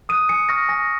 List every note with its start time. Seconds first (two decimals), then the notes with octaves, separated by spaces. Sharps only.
0.09 D#6 F#6 D#7
0.29 G#5 C#7
0.49 C#6 F6 A#6
0.69 G#5 A#6